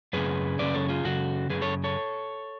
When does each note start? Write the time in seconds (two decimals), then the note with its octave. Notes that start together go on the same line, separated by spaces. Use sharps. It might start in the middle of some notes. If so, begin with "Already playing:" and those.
0.13 F#2 C#3 G#4 B4
0.59 F#2 C#3 B4 D5
0.74 A4 C#5
0.89 F4 G#4
1.04 F#2 C#3 F#4 A4
1.50 F#2 C#3 G#4 B4
1.61 A4 C#5
1.84 A4 C#5